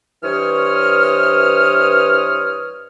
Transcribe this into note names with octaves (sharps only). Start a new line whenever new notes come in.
G2 E3 C5 C#5 D#6 F6